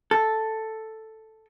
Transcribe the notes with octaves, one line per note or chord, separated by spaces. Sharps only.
A4